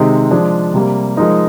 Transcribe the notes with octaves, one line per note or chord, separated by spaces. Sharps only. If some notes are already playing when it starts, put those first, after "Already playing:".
Already playing: C3 D#3 G#3 C4 D#4
F3 G#3 D4 G#4
C3 G3 A#3
F3 G#3 D#4 A#4